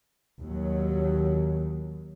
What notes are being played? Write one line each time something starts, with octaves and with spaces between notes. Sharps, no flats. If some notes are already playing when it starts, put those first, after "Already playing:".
D#2 F#3